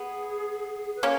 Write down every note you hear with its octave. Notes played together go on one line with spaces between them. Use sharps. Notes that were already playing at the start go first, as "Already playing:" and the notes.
Already playing: B3 G#4
B4
A#3 C#4 A#4